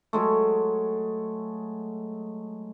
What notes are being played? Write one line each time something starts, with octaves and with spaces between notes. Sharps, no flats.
F#3 G#3 A3